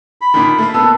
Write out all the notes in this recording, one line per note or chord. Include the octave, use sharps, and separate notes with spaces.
B5
A#2 D3 D#3
A3 A#3
B2 B3 A4